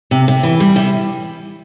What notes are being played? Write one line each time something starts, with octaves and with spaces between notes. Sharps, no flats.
C3
C3
E3
G3
C3